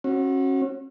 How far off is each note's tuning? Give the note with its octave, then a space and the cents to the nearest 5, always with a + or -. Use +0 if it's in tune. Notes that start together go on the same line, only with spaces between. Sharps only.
C#4 -35 F#4 +0